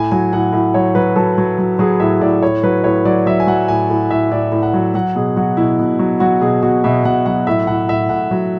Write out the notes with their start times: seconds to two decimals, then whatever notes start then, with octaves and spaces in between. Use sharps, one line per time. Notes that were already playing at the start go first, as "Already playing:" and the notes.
Already playing: A2 G#5
0.11 F#3 G#5
0.33 A2 F#5
0.53 A2
0.74 F#3 C#5
0.95 F#3 B4
1.16 F#3 A4
1.38 F#3
1.58 F#3
1.79 F#3 G#4
2.00 A2 E5
2.21 A2 D5
2.42 A2 C#5
2.63 F#3 B4
2.84 A2 C#5
3.05 F#3 D5
3.26 F#3 E5
3.40 G#5
3.47 F#3 F#5
3.68 A2 G#5
3.90 A2
4.11 A2 E5
4.31 A2 D5
4.52 A2
4.63 F#5
4.74 F#3
4.94 F#3 F#5
5.15 B2 G#4
5.36 F#3 F#4
5.57 B2 E4
5.79 B2
5.99 F#3
6.20 F#3 F#4
6.42 B2 G#4
6.63 B2 F#4
6.84 B2 E5
7.04 B2 F#5
7.26 F#3 F#5
7.47 A2 E5
7.67 A2 F#5
7.88 A2 E5
8.09 A2 F#5
8.31 F#3